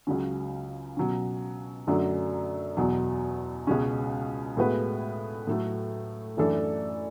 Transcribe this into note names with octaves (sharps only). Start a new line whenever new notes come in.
C#2 C#3 F#3 C#4
B2 F#3 C#4
F#2 D3 F#3 A3 D4
E2 B2 F#3
C#2 B2 G#3 C#4
A2 G#3 B3 F#4 B4
A2 F#3 A3
F#2 E3 A3 D4 A4